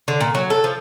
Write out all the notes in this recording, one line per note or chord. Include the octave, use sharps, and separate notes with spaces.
D3
A#2
F#3
A4
F3